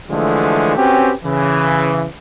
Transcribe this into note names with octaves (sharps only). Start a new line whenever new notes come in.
D3 E3 F3 G#3 A3
C4 C#4 F#4 G4 B4
C#3 E3